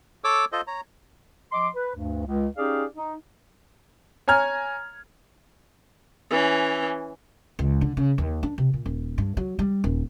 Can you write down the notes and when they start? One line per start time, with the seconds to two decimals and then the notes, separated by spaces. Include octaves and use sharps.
0.24 A4 C#5 D6 E6
0.52 F4 A4 C5 D#5
0.67 C#5 A#5
1.52 F3 D#5 C6 D6
1.75 B4
1.95 D2 G2
2.26 C#2
2.57 C#4 D#4 G4 G#4 D5 F5
2.96 D#4
4.28 C#5 G#5 A#5 F6 G#6
6.30 E3 C#4
7.59 C#2
7.81 D3
7.97 C#3
8.18 D#2
8.43 D4
8.58 C3
8.74 A#2
8.86 D#1
9.18 G2
9.37 F#3
9.59 G3
9.84 D#1